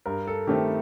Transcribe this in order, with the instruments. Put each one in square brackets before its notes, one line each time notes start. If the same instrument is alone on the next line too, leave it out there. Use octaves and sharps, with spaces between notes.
[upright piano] G2 [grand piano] A#4
[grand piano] A4
[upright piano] D#3 A3 C4 [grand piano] G4